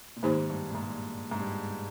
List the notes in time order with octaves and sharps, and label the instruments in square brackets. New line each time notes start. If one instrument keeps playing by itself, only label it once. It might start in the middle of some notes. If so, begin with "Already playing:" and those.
[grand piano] A#2
[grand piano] G#2 [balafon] D#3 A#3 D#4 G4 C5
[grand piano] G2
A#2
G#2
G#2
G2